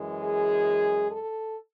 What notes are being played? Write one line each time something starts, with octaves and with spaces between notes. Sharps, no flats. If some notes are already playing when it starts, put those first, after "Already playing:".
Already playing: F#2 E3 G#3
G#4
A4